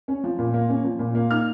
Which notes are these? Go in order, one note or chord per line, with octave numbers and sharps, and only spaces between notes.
C#4
F3
A#2
A#3
C#4
F3
A#2
A#3
D#4 F6